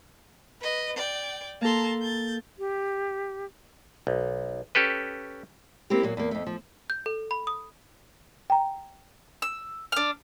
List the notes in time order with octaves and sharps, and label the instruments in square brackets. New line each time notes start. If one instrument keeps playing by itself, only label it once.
[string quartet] B4 D#5
D5 G5
[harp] A#3 A4 [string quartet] A5 A#5 C6
[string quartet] G6 A6
[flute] G4
[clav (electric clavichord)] B1
C#4 G4 A4 B4
[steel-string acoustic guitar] A#3 C4 E4 G4
A#2 F#3 A#3
E2 A#3
F2 A3
F3
[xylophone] G6
A4
B5
D#6
[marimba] G5 A#5
[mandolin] E6
D4 F6